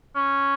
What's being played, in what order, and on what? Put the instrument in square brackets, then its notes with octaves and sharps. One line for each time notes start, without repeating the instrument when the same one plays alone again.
[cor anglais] C#4